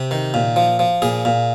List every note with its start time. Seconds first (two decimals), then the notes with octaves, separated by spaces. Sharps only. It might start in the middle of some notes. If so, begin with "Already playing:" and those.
Already playing: C3 G4
0.11 D#3
0.34 A#2
0.56 F3
0.79 F3
1.02 A#2 G#4
1.25 A#2